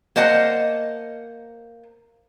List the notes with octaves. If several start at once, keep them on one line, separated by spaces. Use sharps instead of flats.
A#3 C5 D#5 F#5 A5